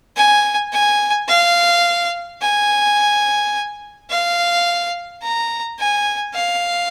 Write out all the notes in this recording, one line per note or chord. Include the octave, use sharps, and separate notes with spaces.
G#5
G#5
F5
G#5
F5
A#5
G#5
F5